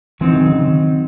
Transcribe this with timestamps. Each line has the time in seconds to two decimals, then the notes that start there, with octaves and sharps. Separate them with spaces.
0.21 E3 F#3 C4 D#4
0.34 D#3
0.46 C#3
0.59 D#3